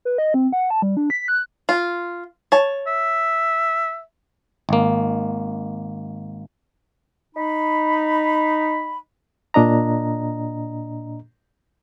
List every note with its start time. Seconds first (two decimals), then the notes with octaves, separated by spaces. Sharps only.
0.05 B4
0.18 D#5
0.34 C4
0.53 F#5
0.70 A5
0.82 G3
0.97 D4
1.10 B6
1.28 F#6
1.69 F4
2.52 C#5 A5
2.87 E5
4.69 G#1 A#3
7.35 D#4 B5
9.54 A#2 D4 D#5 A#5